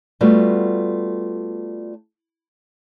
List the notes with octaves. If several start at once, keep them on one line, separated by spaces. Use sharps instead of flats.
G3 A3 B3 F4 F#4